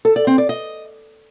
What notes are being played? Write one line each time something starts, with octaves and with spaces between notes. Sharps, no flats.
A4
D5
C4
D5
D#5